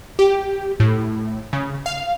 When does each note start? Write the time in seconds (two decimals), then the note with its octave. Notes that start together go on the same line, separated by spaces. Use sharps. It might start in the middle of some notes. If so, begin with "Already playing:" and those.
0.19 G4
0.80 A2
1.53 C#3
1.86 F5